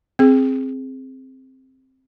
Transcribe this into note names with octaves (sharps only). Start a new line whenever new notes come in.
C4 G#4